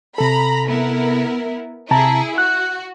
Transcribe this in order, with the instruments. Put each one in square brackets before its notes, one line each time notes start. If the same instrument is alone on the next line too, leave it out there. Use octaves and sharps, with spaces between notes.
[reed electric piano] C3 A4 [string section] A#5 B5
[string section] B3 E4 A#4
[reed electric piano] C3 A5 A#5 [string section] E4 G#4
[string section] F#4 [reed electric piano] F#6